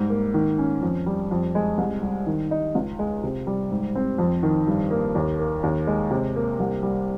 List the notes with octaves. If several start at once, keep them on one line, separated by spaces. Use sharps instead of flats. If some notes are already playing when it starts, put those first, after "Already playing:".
Already playing: G#2 G3
A#3
D#3
C#4
F2
G3
F2
G#3
C2
G3
D#3
D#4
C#2
G#3
C3
G3
G#2
C4
F2
D#3
G2
A#3
D#2
A#3
D#2
G#3
C3
A#3
C2
G3